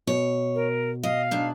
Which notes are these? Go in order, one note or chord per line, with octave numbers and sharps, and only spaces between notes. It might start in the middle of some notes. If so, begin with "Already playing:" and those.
B2 C#5
A#4
D#5 F5
G#2 D4